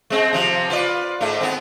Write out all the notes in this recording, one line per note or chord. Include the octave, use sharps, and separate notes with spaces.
G#3 C4
C3 F3 C5
F4 B4 D5
G#2 A3
B3 C4